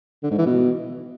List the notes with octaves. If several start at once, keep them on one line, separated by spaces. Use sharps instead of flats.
D3
G#2
E3
B2